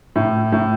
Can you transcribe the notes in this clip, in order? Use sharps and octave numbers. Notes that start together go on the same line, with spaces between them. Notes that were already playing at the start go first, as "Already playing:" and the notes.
A2
A2